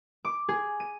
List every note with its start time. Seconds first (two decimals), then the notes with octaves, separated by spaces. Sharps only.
0.25 D6
0.49 G#4
0.80 D#7